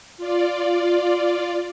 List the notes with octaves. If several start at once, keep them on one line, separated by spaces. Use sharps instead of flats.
F4 D5